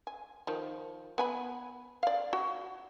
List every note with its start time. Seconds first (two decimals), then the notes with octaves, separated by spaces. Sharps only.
0.07 G#5
0.47 D#3 F3
1.18 B3 G#5 B5
2.03 D5 F5
2.33 F#4